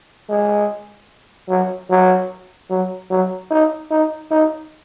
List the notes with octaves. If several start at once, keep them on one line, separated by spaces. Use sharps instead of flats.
G#3
F#3
F#3
F#3
F#3
D#4
D#4
D#4